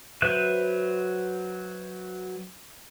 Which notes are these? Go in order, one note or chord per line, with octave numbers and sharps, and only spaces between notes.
F#3 B4 C5 E5 F#6